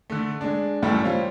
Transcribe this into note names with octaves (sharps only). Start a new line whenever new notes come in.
D3 A3
G#3 D4
C#2 F#2 A2 G3 A3
G3 F4 C5 C#5